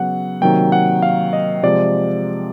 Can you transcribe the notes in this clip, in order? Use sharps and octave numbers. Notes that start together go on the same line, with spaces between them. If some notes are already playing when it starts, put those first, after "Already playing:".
Already playing: C#3 F#3 B3 F#5
C3 D#3 F#3 A#3 G5
F#5
F5
D#5
C3 F3 G#3 D5